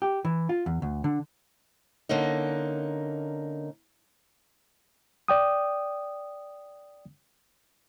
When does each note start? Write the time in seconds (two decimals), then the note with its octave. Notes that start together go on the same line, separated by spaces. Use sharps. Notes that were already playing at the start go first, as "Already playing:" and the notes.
0.02 G4
0.25 E3
0.49 F4
0.66 E2
0.82 D2
1.04 D3
2.09 D3 A#3 C#4 D#4
5.28 D5 G5 D#6